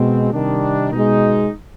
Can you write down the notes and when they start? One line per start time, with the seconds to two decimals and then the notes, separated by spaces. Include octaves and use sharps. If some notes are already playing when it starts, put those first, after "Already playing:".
Already playing: B2 G#3 C4
0.32 C3 D#3 G3 D4
0.91 B2 G#3 D#4